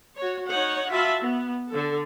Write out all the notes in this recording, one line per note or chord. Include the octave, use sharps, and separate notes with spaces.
F#4 C#5
D#4 C#5 F#5
F4 F#4 E5 A5 B5
B3
D3 A4